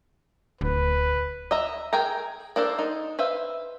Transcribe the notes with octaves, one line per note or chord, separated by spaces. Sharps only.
D1 D2 B4
D#5 E5 A#5
G#4 A#4 G5 G#5 A#5
A#3 D4 A4 C5
D#4
B4 C5 E5 F5